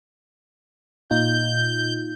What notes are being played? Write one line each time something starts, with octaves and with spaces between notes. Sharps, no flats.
A#2 D#4 F4 G6